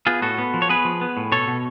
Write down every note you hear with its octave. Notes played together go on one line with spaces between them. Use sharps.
B3 F4 G#4
A2 F#4 A4
B3
F3
C#5
B3 G#4 B4
F3
B3
A2
B2 A4 C#5
B2